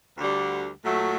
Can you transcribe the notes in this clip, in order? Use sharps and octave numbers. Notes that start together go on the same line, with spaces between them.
D2 D3 G3
A#2 F#3 A3